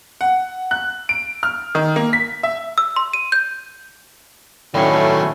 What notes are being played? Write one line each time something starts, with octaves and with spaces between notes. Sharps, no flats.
F#5
F#6
D7
F6
D#3
A#3
B6
E5
E6
C6
D#7
G6
A2 D#3 F#3 A3 C#4 D5 G5 B5